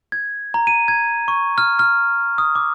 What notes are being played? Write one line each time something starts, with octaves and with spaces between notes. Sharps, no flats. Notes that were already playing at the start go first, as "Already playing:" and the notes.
G#6
A#5
D#7
G#6
C#6
F6
F6
D#6
D6